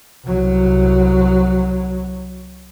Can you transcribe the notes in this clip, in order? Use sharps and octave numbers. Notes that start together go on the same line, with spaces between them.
C2 F#3